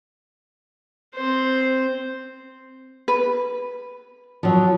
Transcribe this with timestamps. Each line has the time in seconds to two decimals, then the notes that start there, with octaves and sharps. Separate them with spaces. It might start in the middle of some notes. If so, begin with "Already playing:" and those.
1.15 C4 C5
3.08 B4
4.43 F3 F#3